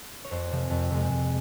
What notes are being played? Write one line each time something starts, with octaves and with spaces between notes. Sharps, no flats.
C#5
F2 C5
C3 F3 G#3
F2
C3 F3 G#3
F2